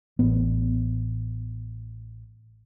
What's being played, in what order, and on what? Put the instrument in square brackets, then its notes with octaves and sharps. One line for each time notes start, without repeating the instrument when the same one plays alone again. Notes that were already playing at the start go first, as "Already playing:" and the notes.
[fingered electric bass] A1 B3